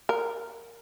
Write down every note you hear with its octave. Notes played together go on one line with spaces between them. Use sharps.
A#4